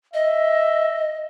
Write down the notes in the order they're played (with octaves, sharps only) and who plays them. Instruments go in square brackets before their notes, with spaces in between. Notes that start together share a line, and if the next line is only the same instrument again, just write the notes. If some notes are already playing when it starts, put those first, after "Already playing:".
[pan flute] D#5 [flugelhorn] E5